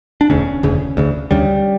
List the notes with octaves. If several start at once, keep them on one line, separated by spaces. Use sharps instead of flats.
D4
E1 D2 C#3 C#4
E1 D2 C#3
D2 C#3
D2 C#3 G3